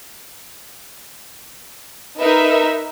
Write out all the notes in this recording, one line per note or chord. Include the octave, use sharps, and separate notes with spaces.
D#4 A#4 B4 E5